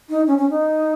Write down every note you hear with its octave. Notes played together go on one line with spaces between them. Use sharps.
D#4
C#4
C#4
D#4